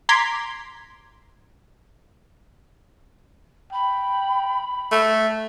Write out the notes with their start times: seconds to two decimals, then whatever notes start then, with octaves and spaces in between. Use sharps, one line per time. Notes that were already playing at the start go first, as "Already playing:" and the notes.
0.09 A#5 C6 D6 G#6 B6
3.72 G5 B5
4.92 A3